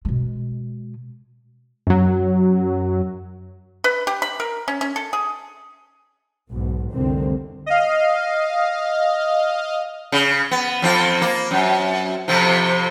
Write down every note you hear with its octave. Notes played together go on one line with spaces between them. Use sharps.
B2 G#3
F#2 F#3
B4
G4
B5
A#4
C#4
C#4
A4
G#4
B1 G#2 B2
F1 C2 D3 D#3 C4
D#5 F5
C#3
B3
F2 C4 F4
A#3
F#2
F2 C3 F3